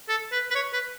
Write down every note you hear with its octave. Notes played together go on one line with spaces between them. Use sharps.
A4
B4
B4
C#5
B4